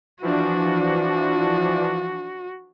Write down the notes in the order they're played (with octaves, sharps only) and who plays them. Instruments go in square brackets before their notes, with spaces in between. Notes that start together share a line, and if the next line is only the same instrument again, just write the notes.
[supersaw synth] E3 F3 D4 [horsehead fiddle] F#4